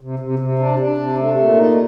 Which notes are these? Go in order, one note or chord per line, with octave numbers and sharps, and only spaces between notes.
C3
C3
C3
D4
D4
C3
A3
A#2
D#4